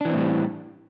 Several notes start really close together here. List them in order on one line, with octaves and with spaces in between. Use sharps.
D4 E3 C4 A2 G3